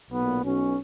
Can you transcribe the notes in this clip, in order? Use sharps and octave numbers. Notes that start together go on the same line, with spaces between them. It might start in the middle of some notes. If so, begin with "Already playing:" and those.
B1 A#2 B3
B1 B2 C#4